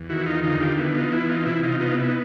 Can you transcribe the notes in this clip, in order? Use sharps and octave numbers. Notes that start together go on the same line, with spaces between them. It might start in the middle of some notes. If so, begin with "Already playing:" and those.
Already playing: E2
D#3 E4 F#4
D#4 F4
D3 D#4 F4
F4 G4
B3 E4
D#4 F4
E3 E4
D#4 F4
C3 E4
D#4 F4
B3 D#4 F4
E4
D#4